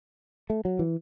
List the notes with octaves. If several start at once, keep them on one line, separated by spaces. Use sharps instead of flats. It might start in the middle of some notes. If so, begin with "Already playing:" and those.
A3
F#3
E3